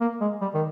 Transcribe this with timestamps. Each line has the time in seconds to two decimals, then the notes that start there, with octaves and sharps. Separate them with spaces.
0.01 A#3
0.21 G#3
0.41 G3
0.54 D#3